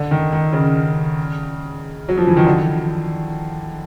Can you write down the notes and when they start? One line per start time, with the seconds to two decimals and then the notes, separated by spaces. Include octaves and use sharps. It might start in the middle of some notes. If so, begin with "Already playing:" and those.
Already playing: D3
0.11 D#3
0.32 D#3
0.53 C#3
2.09 F#3
2.17 F3
2.27 E3
2.37 D#3
2.46 D3